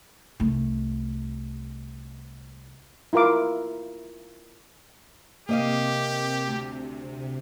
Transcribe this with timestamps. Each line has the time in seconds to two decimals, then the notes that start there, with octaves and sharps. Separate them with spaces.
0.40 C2 A3
3.13 E4 F4 A#4 F5 D6
5.49 C3 A#3 G4 D#5 F5
6.48 D2